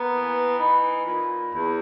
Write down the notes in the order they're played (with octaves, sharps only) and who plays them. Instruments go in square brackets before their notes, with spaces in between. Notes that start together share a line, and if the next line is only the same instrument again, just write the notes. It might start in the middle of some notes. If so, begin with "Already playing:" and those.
Already playing: [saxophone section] A#3 B3 [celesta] A#5
[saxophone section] E3
[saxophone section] D#4 [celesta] B5
[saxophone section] A#2
[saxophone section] E2 [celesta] B5